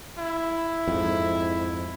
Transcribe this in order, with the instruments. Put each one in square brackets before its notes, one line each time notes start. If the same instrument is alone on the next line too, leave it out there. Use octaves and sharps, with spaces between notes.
[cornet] E4
[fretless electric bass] F2 G#2